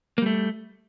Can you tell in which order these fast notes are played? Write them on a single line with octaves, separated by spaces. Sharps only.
A#3 G3 A3